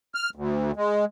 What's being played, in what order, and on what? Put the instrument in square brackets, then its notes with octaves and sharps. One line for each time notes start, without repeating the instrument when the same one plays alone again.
[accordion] F6
D2
G#3